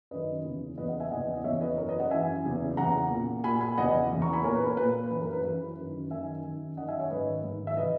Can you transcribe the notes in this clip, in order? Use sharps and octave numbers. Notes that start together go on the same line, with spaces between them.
F#2 D#3 B4 D#5
E2 C#3 E3
E2 C#3 E3 B4 D#5
D#5 F#5
E5 G#5
E2 C#3 E3 D#5 F#5
D#5
E2 C#3 E3 C#5 E5
B4 D#5
F#2 E3 A#4 C#5
B4 D#5
D#5 F#5
F#2 E3 E5 G#5
E2 C#3 E3
E2 C#3 E3 F#5 A#5
A#2
A#2 G#5 B5
G#5 B5
E2 C#3 E3 D#5 F#5
E2 C#3 E3
A#5 C#6
G#5 B5
A#2 A#4 C#5
B4
A#4
A#2 B4
F#2 E3 B4
A#4
B4
F#2 E3 B4
F#2 D#3
F#2 D#3 E5 G#5
F#2 D#3
F#2 D#3 D#5 F#5
E5 G#5
C#5 E5
G#2 D#3 B4 D#5
G#2 D#3
E5
C#3 E3 B4 D#5